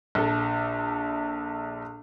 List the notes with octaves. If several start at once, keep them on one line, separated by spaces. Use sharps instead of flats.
A#1 A4